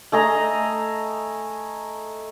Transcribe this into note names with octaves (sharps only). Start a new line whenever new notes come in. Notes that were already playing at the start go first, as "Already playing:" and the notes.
A3 G#4 D#5 A#5